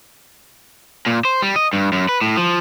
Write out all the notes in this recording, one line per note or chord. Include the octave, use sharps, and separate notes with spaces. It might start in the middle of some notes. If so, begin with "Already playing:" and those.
A#2
C5
G3
D#5
G2
F#2
B4
A2
F3